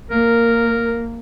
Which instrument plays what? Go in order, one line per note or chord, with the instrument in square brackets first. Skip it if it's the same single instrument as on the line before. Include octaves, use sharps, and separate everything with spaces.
[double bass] A#3 [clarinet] A#4